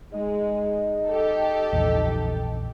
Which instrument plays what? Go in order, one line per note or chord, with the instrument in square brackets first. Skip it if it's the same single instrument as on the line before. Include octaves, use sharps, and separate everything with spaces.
[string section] G#3 [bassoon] D#4
[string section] G4 A4
[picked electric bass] A#1 E2